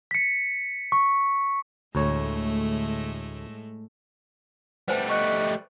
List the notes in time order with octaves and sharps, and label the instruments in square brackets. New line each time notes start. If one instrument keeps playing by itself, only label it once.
[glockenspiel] B6 C#7
C#6
[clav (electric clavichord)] D2 C#5 [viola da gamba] A2 G#3 A3
[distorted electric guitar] G3 A3 [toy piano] B4 C5 G#5 [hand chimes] F#5
[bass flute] D#5 [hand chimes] C#6 F#6 C#7